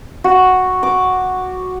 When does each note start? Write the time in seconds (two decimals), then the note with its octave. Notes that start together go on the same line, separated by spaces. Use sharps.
0.24 F#4
0.83 D6